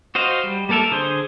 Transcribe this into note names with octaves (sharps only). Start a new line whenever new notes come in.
F#4 C5 D#5 F5
G3
G3 A#3 A4 A#4 E5
D3 G#4 C5 C6